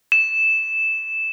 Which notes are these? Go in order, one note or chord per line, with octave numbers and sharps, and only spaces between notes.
E7